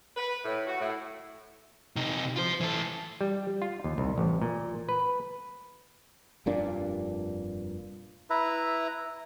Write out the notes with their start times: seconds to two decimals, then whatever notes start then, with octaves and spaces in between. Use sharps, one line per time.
0.17 B4
0.45 A2
0.67 F#4
0.81 A2
1.96 C3 D#4
2.36 F4 C5
2.61 E3 A4
3.21 G3
3.62 F4
3.84 D#2
3.98 C2
4.18 A1
4.42 A#2
4.89 B4
6.46 F1 G2 A#2 D4
8.30 E4 B4 E5 A#5